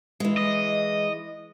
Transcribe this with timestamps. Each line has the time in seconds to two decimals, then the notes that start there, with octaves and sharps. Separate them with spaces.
0.20 E3 G#3
0.37 D#5